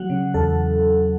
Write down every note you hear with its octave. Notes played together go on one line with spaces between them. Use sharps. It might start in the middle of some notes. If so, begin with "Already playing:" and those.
Already playing: F#3 F#5
C#3
E2 A4